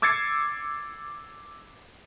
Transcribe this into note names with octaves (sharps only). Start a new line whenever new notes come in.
D6 E6 G#6 A6 C7 C#7